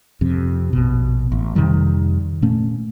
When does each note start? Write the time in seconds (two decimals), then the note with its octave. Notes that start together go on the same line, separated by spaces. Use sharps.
0.21 F2 C3
0.73 A#1 B2
1.32 A1
1.55 F2 C3 D#3 G3
2.42 A#2 A3 C#4